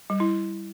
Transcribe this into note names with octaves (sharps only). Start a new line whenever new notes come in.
G3
E4